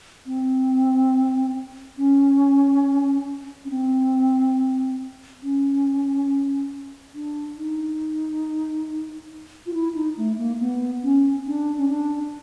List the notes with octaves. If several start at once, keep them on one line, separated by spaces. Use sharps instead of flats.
C4
C#4
C#4
C4
C#4
D4
D#4
F4
E4
D#4
A3
A#3
B3
C#4
D4
C#4
D4